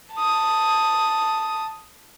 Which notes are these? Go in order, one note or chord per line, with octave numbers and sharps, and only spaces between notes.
A5 D#6